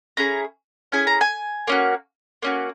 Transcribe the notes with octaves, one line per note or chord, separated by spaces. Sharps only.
C#4 E4 G#4 A#5
C#4 E4 G#4 G#5
A#5
G#5
A#3 C#4 F#4
A#3 C#4 F#4